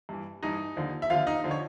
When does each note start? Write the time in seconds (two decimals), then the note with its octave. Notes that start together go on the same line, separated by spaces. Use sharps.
0.09 G2 E3
0.43 G2 E3 D#4 D#5
0.76 D#2 D3 F3
1.02 E5
1.10 D#2 D3 F3 F4 F5
1.27 D#4 D#5
1.44 D3 F3
1.51 C#5